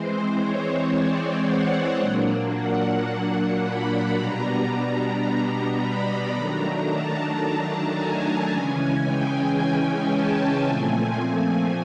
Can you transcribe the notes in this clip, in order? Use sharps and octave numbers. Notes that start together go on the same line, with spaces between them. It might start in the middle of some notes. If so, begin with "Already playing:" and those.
Already playing: E3 G#3 C4 C5
C#5
D5
F#5
A#2 F#3 A#3 D4
F#5
B5
B2 G3 B3 D4 A#5
A#5
A#5
B5
D#3 F#3 A3 D4 A#5
A5
G#5
C#3 E3 G#3 C#4
G5
A5
A#2 F3 A3 C4 G#5
G#5